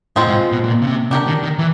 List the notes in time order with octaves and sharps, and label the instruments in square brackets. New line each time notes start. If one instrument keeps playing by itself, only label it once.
[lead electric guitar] A2 [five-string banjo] F3 G#3 C4 F4
[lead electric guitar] G#2
B2
A#2
C#3
C3
[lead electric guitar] C#3 [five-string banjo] D4 G4 A#4
[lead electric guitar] D#3
D#3
E3